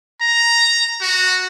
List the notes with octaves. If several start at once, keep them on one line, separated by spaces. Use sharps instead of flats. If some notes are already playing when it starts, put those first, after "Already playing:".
A#5
F#4